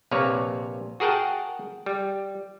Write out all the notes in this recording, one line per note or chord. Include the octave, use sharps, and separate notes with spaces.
A#1 C3 A#3 B4 C#5
F#4 G#4 A#4 F#5 G5 A5
G3